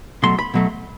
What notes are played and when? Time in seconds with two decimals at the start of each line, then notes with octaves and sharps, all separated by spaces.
0.23 B2 F#3 A3 C6
0.39 B5
0.54 B2 F#3 A3